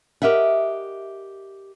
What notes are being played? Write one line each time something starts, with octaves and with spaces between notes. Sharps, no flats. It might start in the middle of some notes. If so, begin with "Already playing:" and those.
G4 A#4 D#5 E5 F#5